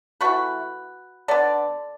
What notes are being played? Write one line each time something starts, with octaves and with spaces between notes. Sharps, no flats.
E3 A3 F#4 B4
D3 B3 A4 D5